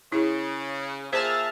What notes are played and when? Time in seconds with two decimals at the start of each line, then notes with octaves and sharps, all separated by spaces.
0.12 C#3 E4 G#4
1.13 A#2 G#4 C5 E5 A5 F6